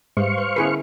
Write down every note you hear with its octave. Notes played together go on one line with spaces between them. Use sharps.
G#2 G3 G4 B4 C5 F5 C#6
B4
D3 B3 C#4 E4 G#4 B4